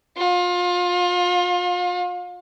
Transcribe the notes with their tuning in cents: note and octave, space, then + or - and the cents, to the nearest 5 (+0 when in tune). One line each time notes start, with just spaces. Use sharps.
F4 +30